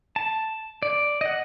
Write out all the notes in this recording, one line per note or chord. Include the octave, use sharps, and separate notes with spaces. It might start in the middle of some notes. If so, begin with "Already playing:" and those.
A5
D5
D#5 F#5